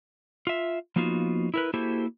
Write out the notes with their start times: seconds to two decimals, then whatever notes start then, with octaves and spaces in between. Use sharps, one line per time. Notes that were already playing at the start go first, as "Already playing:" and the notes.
0.47 F4 E5
0.96 F3 A#3 B3 D#4 F4 F#4
1.54 E4 A#4 B4
1.74 A#3 E4 F#4 G4 A4 C5